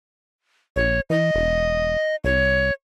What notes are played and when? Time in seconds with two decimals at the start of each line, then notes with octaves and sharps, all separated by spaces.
0.76 A#1 C#5
1.10 E3 D#5
1.34 E1
2.24 C2 C#5